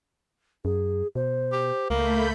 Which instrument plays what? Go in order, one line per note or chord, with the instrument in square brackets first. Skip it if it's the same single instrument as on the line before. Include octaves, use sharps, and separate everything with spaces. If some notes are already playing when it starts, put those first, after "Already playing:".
[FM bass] F#2 [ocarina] G#4
[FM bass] B2 [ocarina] C5
[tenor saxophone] G4
[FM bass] C#2 [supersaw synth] A3 B5 G6 [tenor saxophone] A#3